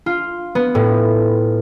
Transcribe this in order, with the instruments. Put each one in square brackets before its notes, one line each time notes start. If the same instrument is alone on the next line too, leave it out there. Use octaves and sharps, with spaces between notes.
[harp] F4
B3
A2